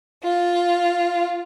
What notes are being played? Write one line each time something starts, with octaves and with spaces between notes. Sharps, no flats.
F4